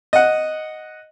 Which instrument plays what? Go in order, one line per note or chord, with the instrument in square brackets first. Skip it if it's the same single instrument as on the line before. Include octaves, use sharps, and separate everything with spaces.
[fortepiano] D#5 F#5